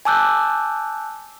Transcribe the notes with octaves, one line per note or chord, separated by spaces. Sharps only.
G#5 A5 D6 E6 F#6 G6